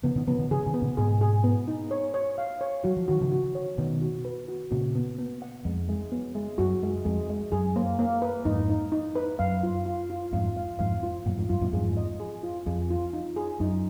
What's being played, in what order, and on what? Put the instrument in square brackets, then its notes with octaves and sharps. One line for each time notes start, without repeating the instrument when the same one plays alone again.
[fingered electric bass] C#3 F3 [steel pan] B3
[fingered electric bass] B2 D#3
[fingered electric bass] C#3 F3 [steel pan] B3
[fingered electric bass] B2 D#3
[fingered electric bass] C#3 F3 [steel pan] G#4
[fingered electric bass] B2 D#3
[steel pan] B3
[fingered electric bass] A#2 C#3
[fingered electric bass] G#2 B2 [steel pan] G#4
[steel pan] G#4
B3
D#4
C#5
C#5
F5
C#5
[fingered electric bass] F#3 [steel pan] F#4
[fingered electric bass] F3
[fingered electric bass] D#3 [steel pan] F#4
[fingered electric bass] C#3 F3
[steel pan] F#4
C#5
[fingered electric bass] B2 D#3 [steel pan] B3
[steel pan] F#4
B4
F#4
[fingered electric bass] A#2 C#3 [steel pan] F#4
[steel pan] B3
B3
F#5
[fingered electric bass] F2 [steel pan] G#3
[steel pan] G#3
B3
G#3
[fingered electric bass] F#2 [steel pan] F#4
[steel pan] G#3
[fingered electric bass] F2 [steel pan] G#3
[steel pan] G#3
[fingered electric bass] F#2 [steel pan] G#4
[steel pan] A#3
A#3
B4
[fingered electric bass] F2 G#2 [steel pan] D#4
[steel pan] D#4
D#4
B4
[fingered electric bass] F#2 [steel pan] F5
[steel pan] F4
F4
F4
[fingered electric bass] F2 G#2 [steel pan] F5
[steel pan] F5
[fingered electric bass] F2 G#2 [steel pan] F5
[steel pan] F4
[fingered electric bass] F#2 A#2 [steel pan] F#5
[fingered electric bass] F2 G#2
[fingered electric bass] F#2 [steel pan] F4
[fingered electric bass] F#2 A#2
[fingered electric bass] F2 G#2 [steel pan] G#4
[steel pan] D#5
G#4
F4
[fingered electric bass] F2 [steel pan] G#4
[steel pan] F4
D#4
G#4
[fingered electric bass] F#2 [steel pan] D#4